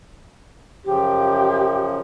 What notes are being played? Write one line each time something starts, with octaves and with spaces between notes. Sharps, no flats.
F#2 C#3 F3 G4